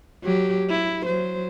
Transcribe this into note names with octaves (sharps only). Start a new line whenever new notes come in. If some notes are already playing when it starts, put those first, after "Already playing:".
F#3 G4
E4
F#3 C5